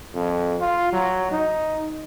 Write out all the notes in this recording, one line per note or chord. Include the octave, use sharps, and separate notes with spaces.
F2
F4
F#3
D#4